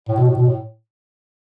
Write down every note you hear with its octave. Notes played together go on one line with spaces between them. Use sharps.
A2
B2
A2
B2
A2